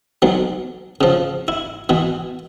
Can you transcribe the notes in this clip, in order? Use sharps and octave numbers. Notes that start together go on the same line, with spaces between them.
B1 F#3
C#3 F3
E4
B2 E3